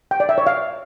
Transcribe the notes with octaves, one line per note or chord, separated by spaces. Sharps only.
G5
D5
E5
C#5
F5